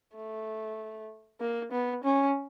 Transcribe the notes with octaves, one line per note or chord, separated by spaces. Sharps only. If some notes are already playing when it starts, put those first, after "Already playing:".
A3
A#3
B3
C#4